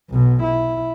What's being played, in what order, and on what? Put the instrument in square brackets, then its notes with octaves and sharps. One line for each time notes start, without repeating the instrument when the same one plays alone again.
[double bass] B1 B2
E4